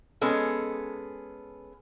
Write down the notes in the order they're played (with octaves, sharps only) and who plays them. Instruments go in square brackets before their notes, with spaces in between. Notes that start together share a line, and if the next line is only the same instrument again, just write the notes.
[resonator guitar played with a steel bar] G#3 B3 C#4 A4